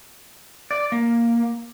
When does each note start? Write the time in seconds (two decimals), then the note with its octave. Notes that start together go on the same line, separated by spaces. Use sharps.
0.71 D5
0.92 A#3